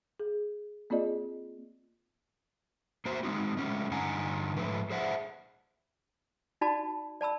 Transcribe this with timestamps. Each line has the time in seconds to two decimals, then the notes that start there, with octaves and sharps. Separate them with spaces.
0.20 G#4
0.90 A#3 C4 F4 G#4 D5 D#5
3.05 A#3 F#4 C5
3.23 G#3 C4 D#4 F#4
3.57 G#3 A3 C#4
3.91 G2 D3 D#4 F#5 G#5 A#5
4.56 G#2 F3 A3 B4
4.90 G#4 C5 E5 F#5
6.61 D#4 F#4 D5 A5 B5
7.21 D5 A5 B5 E6